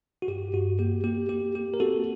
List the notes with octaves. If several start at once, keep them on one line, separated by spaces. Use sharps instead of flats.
F#4
G2 G4
G2 F#4
A#3 G4
A#3 G4
A#3 G4
A#3 G4
A#4
C4 F#4 A4